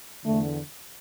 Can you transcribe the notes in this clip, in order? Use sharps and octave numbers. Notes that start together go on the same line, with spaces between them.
E2 D3 A3